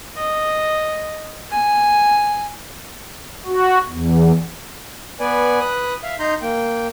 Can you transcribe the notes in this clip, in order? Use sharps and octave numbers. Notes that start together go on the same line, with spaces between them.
D#5
G#5
F#4
E2
B3 B4 D5 G#5
B4 D#6 F#6
E5 F5
D#4 A#5 C6 G6
A#3 G5